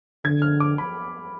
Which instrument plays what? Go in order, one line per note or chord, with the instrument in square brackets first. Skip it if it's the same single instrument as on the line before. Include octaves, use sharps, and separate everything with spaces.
[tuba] D3 [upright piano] G#6
[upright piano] F6
D6
B5